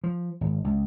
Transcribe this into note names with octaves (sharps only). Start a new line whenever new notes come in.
F3
G#1
C#2